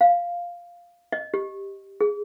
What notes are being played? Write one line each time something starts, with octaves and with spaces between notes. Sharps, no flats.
F5
D#5
G4
G#4